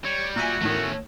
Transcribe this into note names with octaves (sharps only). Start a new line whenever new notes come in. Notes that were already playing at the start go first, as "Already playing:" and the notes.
G3 C#5
A#2 F#4 E5 G#5
E2 A2 D#3 A3 C#4